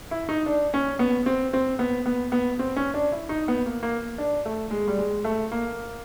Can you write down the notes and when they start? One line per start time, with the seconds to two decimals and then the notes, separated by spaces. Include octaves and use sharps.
0.11 E4
0.29 D#4
0.46 D4
0.74 C#4
0.99 B3
1.26 C4
1.53 C4
1.79 B3
2.06 B3
2.32 B3
2.59 C4
2.76 C#4
2.94 D4
3.12 E4
3.29 D#4
3.48 B3
3.66 A#3
3.83 A#3
4.18 D4
4.45 A3
4.71 G#3
4.88 G3
4.99 G#3
5.25 A3
5.52 A#3